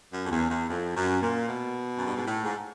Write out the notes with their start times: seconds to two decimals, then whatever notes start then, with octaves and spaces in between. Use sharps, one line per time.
0.10 F#2
0.25 F2
0.30 E2
0.49 E2
0.69 F2
0.96 F#2
1.21 A#2
1.47 B2
1.97 F#2
2.06 G2
2.16 G#2
2.25 A2
2.44 G#2